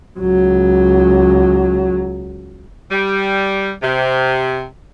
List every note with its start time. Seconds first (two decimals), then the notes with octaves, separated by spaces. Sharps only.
0.20 C#2 F#3
2.91 G3
3.83 C3